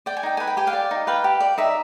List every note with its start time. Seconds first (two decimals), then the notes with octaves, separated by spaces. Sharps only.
0.06 D5 G5
0.17 G#5
0.23 D#4 G5
0.37 B4 G#5
0.47 G5
0.57 G4 G#5
0.67 F5 G5
0.73 D5
0.91 D#4
1.07 B4 F5 G5
1.24 G4
1.40 D5
1.58 D#4 E5